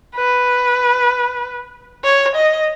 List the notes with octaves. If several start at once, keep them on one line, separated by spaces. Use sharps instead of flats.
B4
C#5
D#5